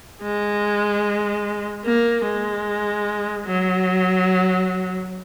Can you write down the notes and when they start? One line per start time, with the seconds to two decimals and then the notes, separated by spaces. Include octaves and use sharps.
0.22 G#3
1.84 A#3
2.25 G#3
3.46 F#3